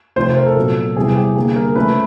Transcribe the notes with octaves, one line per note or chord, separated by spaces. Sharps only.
C3 F3 A3 C5
C5
A#4
A4
A#2 F#3 B3
C3 E3 G3 B3 G#4
G4
D3 G3 A#3 G#4
A#4
C#3 F3 A3 B4